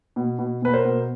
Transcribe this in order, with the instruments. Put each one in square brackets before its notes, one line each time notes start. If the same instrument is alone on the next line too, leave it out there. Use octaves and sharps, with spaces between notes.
[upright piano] B2
B2
B2 B4
A#4 C5
B2